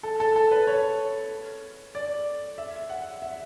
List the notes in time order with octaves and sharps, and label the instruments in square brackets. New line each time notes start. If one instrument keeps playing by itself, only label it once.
[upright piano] A4
A4
A4
B4
C#5
D5
E5
F#5
E5